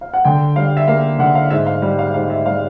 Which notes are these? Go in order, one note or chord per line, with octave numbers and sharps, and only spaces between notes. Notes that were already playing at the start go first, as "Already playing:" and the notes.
F5
F#5
D3 G5
G3 F5
E5
A#3 F5
D3 F#5
F5
G#2 E5
F5
G3
F5
G#2 F5
E5
G3 F5